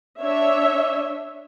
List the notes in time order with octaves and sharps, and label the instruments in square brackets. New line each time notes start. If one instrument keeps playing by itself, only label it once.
[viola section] D4 C#5 E5